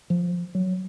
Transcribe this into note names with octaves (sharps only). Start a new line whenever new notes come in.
F3
F#3